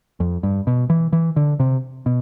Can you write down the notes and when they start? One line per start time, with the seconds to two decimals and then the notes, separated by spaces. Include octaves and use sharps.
0.20 F2
0.43 G2
0.67 B2
0.90 E3
1.13 E3
1.36 D3
1.60 C3
2.06 B2